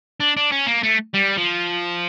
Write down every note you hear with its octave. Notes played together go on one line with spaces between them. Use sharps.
D4
D4
C#4
A#3
A3
G3
F3